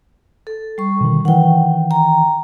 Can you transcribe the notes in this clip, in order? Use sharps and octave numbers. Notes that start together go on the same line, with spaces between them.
A4
G3 C#6
B2 D3 D#3
D#3 E3 F#5 G5
G5 A#5